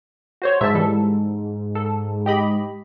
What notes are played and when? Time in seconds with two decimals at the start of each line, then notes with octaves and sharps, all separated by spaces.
0.42 F#4 C5 C#5
0.61 G#2 E5 A5
0.75 E3 G3 A4
1.75 A4
2.26 G4 D#5 B5